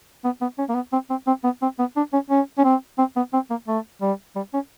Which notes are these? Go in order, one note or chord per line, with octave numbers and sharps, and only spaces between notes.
B3
B3
C#4
A#3
B3
C4
C4
C4
B3
C4
B3
D4
C#4
C#4
C#4
C4
C4
B3
C4
A#3
A3
G3
G3
C#4